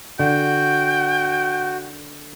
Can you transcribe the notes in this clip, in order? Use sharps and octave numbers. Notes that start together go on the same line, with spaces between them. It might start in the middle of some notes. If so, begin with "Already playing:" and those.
D3 F#4 G5